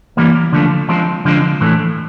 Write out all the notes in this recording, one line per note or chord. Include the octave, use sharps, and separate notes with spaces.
E3 G3 A#3
D3 F3 A3
F3 G#3 C4
D3 F3 G#3 C4
A2 E3 A3